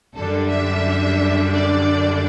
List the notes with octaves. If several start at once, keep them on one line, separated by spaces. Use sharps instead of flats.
F#2 D3 G3 D4 A4
E5
D5